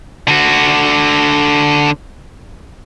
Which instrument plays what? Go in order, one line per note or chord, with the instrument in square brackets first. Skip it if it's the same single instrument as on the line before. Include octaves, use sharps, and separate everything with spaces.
[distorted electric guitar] D3 F#4